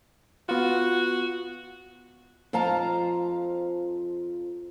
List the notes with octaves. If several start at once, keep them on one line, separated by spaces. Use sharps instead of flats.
B3 F4 F#4
F2 F3 F5 A5 A#5